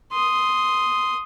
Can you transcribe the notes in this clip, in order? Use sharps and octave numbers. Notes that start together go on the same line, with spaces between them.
C6 D#6